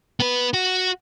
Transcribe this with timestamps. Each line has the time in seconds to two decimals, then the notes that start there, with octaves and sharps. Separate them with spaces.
0.20 B3 B4
0.54 F#4